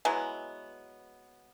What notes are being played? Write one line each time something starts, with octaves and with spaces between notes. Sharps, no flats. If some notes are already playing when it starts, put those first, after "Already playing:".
E3 F#3 G#3 B3